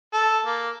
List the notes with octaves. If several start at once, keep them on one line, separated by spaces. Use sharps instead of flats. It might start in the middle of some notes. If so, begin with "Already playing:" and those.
A4
A#3